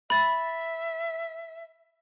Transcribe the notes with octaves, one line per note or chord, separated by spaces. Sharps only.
E5 B5 A6